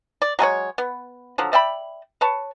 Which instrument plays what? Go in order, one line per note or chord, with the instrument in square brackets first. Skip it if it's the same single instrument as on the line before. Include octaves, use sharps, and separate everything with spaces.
[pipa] D5
F#3 G#3 A4 C#5
B3
D3 F3 F#3
D5 E5 G5 B5
B4 C#5 A5